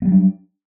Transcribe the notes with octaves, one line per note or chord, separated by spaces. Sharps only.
F#3 G3 A#3 D4